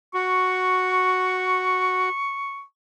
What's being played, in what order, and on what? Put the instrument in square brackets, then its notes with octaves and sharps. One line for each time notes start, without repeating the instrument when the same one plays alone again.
[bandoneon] F#4 [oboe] C#6